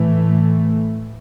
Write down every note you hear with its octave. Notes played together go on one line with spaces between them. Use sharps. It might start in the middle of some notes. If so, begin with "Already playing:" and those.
Already playing: A2 E3 A3